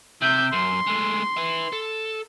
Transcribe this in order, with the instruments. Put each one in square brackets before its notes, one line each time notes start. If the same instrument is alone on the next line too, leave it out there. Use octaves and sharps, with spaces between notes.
[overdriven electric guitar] C3 [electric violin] E5 G6
[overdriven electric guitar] F#2 [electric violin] C6
[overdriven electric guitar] G#3 A3
B4 E5
A4